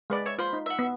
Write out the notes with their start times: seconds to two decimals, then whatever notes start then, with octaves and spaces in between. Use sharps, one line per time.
0.10 G#3 B4 D5
0.26 C#5 E5 C#6
0.39 F4 C5 B5
0.53 D#4
0.66 E5 F#5
0.79 B3